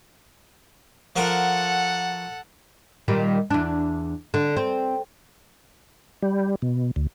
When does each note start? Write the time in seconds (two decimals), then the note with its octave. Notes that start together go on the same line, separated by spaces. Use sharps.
1.16 F3 F#4 A4 A#4 F#5
3.08 A#2 D#3 G3
3.50 E2 D4
4.34 D3
4.57 C4
6.22 G3
6.62 B2
6.96 D2